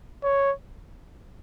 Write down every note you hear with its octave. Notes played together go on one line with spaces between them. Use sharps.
C#5